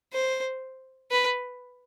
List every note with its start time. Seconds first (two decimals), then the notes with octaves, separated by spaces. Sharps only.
0.13 C5
1.11 B4